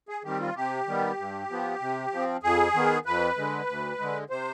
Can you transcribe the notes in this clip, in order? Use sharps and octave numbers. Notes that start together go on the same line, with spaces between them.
G#4
D#3 G3 C4 G4
F4
C3 G4
D#3 G3 B3
G2
F3 B3
C3
F3 C4
F2 G#4
D#3 B3
F2 B4
D3 G#3
D2
D3 G#3
C3 C5